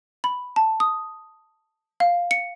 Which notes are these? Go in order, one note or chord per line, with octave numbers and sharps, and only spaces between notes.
B5
A5
D#6
F5
C#7